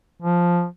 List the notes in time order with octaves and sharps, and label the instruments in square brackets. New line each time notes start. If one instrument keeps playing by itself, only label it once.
[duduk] F3